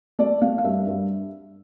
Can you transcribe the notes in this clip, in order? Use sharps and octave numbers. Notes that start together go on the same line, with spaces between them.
A3 D5
A3 F5
F5
G2 E5
G2